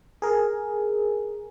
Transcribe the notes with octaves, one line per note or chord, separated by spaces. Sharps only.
G#4 A#4